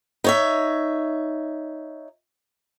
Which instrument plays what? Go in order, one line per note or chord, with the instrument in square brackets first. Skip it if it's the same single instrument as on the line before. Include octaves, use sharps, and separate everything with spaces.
[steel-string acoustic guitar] D#4 C#5 E5